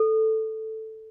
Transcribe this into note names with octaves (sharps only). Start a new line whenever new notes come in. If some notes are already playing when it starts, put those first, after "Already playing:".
Already playing: A4